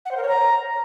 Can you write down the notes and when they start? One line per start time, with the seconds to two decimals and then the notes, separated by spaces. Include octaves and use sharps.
0.05 F#5
0.11 C5
0.17 A#4
0.22 C#5
0.28 A#5